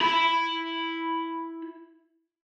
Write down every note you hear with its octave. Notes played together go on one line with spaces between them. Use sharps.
E4 B5